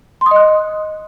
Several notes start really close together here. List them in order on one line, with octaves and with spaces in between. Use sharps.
C6 D#6 D#5 F#6